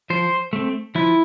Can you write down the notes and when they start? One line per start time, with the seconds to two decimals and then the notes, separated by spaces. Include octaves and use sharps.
0.10 F3 C5
0.53 A3 C4
0.95 F3 E4